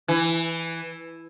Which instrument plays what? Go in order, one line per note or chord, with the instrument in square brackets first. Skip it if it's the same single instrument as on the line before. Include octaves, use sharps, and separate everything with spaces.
[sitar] E3